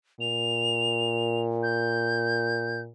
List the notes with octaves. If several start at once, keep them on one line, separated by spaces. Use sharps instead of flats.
A#2 F7
G6